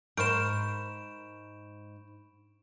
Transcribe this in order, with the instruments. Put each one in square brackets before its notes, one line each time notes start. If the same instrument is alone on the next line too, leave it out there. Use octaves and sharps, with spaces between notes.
[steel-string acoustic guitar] G#2 [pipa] A#4 C5 [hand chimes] B5 C#6 G6 [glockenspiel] D7 E7